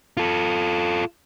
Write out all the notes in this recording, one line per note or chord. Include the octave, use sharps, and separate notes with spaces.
F4 A4